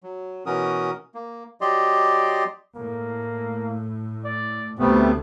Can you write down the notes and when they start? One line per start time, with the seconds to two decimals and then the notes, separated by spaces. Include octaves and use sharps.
0.03 F#3
0.46 B2 E3 C#4 F#4 A#4 D#6
1.14 A#3
1.61 F#3 G4 D5 D#5 C6
2.75 A2 A#3
4.25 D5
4.79 D2 C3 G3 A3 B3